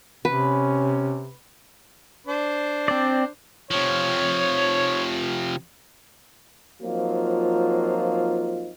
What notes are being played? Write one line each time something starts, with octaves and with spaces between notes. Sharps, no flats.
C3 C#4 B4
D4 C5
C4 D5
C3 F3 C#5
F3 F#3 A#3 C4 D#4 F4